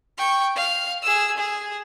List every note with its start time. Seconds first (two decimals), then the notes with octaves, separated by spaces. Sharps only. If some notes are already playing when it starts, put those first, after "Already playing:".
0.18 G5 C#6
0.55 F5
1.02 G#4 E6
1.36 G#4